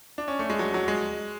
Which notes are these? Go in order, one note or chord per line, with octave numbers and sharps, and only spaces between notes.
D4
C#4
A3
G#3
F#3
F#3
G#3